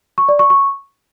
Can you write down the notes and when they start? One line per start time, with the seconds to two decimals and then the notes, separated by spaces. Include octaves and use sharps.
0.18 C#6
0.29 D5
0.39 C#6
0.50 C#6